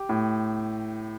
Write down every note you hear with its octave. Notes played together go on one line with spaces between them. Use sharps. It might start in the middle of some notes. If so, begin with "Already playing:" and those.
Already playing: G4
A2